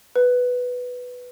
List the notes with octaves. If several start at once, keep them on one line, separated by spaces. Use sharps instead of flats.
B4